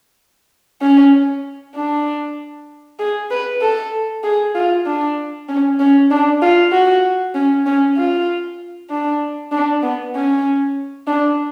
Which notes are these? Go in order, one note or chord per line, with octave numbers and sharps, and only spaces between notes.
C#4
D4
G#4
B4
A4
G#4
F4
D4
C#4
C#4
D4
F4
F#4
C#4
C#4
F4
D4
D4
B3
C#4
D4